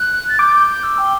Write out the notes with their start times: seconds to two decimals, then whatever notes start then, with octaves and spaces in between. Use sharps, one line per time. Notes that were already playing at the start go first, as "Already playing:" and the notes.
Already playing: F#6
0.29 A6
0.39 D6 G6
0.54 G6
0.68 G6
0.83 E6
0.98 G5